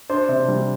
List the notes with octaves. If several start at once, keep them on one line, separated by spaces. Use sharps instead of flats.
D4 C5
C3
G3